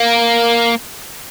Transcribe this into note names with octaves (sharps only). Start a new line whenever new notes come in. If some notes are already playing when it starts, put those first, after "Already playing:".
Already playing: A#3